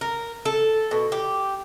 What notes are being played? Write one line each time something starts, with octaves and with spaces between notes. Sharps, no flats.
A#4
A4
B2
G4